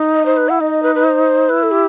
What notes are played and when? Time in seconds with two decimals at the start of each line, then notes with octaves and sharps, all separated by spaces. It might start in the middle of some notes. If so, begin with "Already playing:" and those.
Already playing: D#4
0.15 D#5
0.26 C5
0.37 B4
0.49 E4 F#5
0.60 D#4 D#5
0.83 B4
0.95 B4
1.05 C5
1.49 E4 B4
1.63 A4
1.71 G4